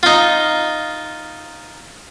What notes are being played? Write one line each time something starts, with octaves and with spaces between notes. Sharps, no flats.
D#4 F4